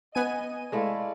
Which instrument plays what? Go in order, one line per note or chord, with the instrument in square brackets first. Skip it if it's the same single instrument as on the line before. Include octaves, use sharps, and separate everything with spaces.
[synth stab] B3 G#5 D#7 [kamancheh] D#5
[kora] G#3 A3 E4 [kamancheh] D5 F5